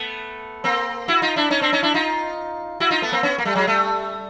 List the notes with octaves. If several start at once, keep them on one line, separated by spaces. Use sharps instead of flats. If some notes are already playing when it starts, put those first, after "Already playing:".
Already playing: A3 B3
A#3 C4
E4 F#4
D#4 F4
D4 E4
C#4 D#4
C4 D4
C#4 D#4
D4 E4
D#4 F4
E4 F#4
D#4 F4
A3 B3
A#3 C4
B3 C#4
A#3
G3 A3
F#3 G#3
G3 A3